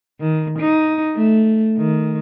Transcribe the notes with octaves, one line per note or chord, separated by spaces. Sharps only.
D#3
D#4
A3
D#3